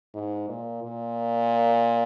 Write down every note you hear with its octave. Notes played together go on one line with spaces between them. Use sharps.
G#2
A#2
A#2